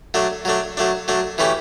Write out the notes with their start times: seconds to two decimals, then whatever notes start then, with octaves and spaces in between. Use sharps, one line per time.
0.14 F#3 A3 D4
0.45 F#3 A3 D4
0.77 F#3 A3 D4
1.08 F#3 A3 D4
1.38 E3 A3 C#4 G4